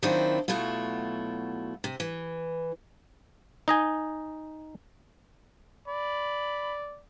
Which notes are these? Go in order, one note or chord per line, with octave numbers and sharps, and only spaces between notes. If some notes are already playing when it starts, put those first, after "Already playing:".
D#3 F#3 C4 D4 E4 F4
B2 F#3 A3 E4 F4
C3
E3
D#4 D#5 G#5
D5 B5